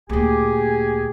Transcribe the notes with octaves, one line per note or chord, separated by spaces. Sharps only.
D2 A#2 G4 G#4 G#5